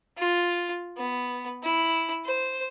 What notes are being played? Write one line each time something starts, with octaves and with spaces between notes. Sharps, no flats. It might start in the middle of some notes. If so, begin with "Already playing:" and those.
F4
B3
E4
C5